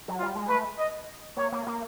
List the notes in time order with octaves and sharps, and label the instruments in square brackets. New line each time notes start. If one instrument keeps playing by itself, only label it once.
[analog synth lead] F#3
[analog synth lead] G3 [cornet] F4
[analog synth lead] G#3
[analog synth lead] A3 [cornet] B4
[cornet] D#5
[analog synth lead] A#3 [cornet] C#5
[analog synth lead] A#3
A#3